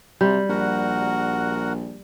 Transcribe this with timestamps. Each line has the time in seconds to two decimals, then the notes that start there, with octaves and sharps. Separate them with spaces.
0.21 C3 G3
0.49 A#1 F#4 A#4 F#5